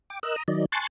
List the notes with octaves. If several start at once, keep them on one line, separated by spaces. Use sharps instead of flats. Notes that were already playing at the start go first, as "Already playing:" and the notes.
G5 D6
A#4 D#5 E6 F#6
A#5 D#6
D#3 F#3 D5 D#5
G#5 A5 C6 C#6 F#6 A6